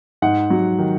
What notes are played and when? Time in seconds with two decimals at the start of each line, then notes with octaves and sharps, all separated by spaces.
0.22 G#2 F#5
0.50 F#3
0.79 D#3